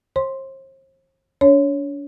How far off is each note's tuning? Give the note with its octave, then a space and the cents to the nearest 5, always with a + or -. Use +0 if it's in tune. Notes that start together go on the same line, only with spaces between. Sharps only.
C5 +40 C6 +0
D4 -45 C#5 +0